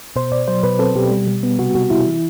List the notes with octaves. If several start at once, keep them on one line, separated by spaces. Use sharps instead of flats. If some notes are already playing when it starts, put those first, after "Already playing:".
B2 C5
B2 D5
F#3 C5
B2 B4
C4 A4
B2 G4
G3
G3
B3
C3 F#4
C3 F#4
C3 E4
E3